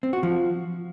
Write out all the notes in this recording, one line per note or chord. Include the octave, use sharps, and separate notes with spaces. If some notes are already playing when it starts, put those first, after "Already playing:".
C4
F#4
F3